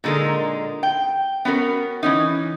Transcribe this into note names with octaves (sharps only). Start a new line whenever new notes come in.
A#2 D3 G#3 D#4 A#4
G5
B3 C#4 F#4 A#4
E3 C#4 D#4